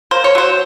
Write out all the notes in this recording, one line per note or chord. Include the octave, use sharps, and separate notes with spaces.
A#3 C5
C#5
F#3 C5